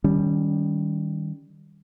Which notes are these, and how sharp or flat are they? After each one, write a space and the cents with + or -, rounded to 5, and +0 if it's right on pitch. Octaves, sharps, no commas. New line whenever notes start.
D#3 +0 G3 +0 C#4 +30